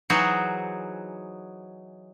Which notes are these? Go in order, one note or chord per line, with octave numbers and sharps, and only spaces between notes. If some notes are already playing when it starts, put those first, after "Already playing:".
E3 F#3 D#4 F#4 G#4 C5